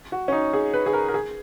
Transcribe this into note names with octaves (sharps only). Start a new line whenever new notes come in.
F#4
C#4
D#4
G#4
B4
G#4
A#4
A#4
G#4